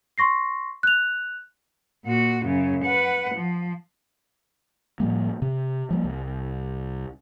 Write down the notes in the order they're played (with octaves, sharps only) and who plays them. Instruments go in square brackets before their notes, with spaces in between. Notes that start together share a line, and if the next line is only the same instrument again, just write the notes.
[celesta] C6 C#6 A#6 C7
F#6 F7
[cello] A#2 F#4
F#2 C#3
B4 F#5
F3
[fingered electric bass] A2 F3 G3 A#3
C3
F3 G3 A#3
C2